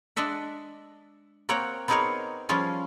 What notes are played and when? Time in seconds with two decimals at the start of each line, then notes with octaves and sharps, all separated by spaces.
0.16 G#3 D4 D#5 E5 F#5
1.49 A#3 C4 A#4 C#5 F#5 G5
1.88 B3 C4 D#4 G#4 A#4 C#5
2.49 F3 G3 C#4 F4 G#4